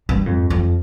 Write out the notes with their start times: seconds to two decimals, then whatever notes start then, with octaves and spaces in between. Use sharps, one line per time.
0.09 G2
0.26 F2
0.50 F2